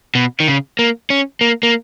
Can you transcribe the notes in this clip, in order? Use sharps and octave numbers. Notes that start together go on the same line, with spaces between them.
B2
D#3
C#3
A#3
C#4
A#3
A#3